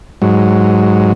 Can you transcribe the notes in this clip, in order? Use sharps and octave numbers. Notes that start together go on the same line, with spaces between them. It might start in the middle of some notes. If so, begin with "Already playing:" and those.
G#2 F#3